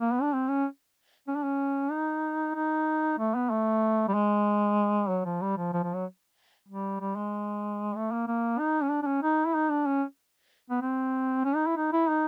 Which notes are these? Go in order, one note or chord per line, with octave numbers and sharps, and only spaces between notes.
A#3
B3
D4
C4
C#4
C#4
D4
C#4
D#4
D#4
A3
B3
A3
G3
G#3
F#3
F3
G3
F3
F3
F3
F#3
G3
G3
G#3
A3
A#3
A#3
D#4
C#4
D4
D4
C#4
D#4
E4
D#4
D4
C#4
B3
C4
C#4
D#4
E4
D#4
E4
D#4